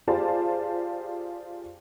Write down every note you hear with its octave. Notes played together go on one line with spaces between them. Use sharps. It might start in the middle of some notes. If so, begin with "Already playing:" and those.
F4 G4 G#4 C5 D5 A5